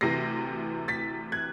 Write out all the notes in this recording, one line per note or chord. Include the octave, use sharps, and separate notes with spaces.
D2 C3 E3 A#6 C7
A6 B6
F#6 G#6